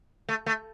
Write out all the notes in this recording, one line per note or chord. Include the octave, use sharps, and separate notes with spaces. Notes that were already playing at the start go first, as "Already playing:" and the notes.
A3
A3